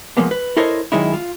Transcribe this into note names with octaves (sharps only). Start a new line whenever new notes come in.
F3 G#3 A#3 B3
B4
E4 A4 A#4 C5 C#5 D#5
F#2 D#3 G#3 D#4 E4
F4